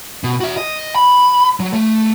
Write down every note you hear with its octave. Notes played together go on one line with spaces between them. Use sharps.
B2
F#4 E5
D#5
B5
F#3
A3